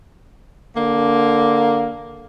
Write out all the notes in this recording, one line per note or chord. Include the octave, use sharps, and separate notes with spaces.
D3 A#3